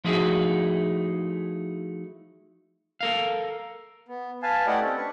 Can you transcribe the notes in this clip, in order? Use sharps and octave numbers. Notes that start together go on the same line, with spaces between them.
F3 A3 D#4 E4 F#4 G#4
A4 A#4 F5
B3
B4 F5 G#5 A5
A3 E4 G4 D5 D#5 F#5
C4 C#4 A4
D4 B4 C#6